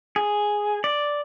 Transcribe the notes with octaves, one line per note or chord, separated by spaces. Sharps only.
G#4
D5